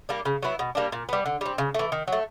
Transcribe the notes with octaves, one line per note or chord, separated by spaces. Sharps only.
G3 A#3 D4
C#3
F#3 B3 E4
B2
G3 A#3 D4
A#2
G3 B3
D3
G3 C4
C#3
E3 A3
D#3
F#3 A3